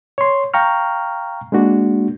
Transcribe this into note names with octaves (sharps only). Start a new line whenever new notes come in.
C#5 C6
F5 G5 A#5 C#6 F6
G#3 A#3 D4 F#4